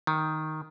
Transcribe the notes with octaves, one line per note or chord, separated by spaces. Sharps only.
D#3